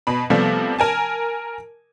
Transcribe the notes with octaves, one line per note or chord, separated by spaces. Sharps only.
B2 B5
C3 F3 G3 A3 B3
A#4 G#5 A5